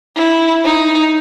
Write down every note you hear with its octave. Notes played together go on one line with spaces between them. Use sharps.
E4
D#4